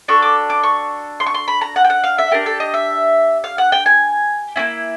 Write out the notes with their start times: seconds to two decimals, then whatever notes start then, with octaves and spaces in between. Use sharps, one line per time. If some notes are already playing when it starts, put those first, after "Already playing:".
0.08 D4 F#4 A4 C#6
0.22 D6
0.50 D6
0.63 C#6
1.20 C6
1.26 C#6
1.34 C6
1.48 B5
1.61 A#5
1.76 F#5
1.84 G5
1.90 F#5
2.04 F5
2.18 E5
2.31 D4 G4 A#4
2.46 A4
2.60 D#5
2.74 E5
3.44 F5
3.58 F#5
3.72 G5
3.86 G#5
4.56 A#3 C#4 E4